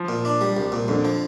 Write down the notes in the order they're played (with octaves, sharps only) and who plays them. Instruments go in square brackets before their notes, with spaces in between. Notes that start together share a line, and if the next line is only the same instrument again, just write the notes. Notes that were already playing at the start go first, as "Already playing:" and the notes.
Already playing: [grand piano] F3
[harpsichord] A#2
D4
G3
C2
A#2
[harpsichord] F2 [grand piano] D3
[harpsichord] F3